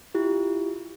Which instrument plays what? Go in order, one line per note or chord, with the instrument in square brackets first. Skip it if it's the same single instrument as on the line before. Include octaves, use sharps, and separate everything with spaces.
[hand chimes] E4 F4 G4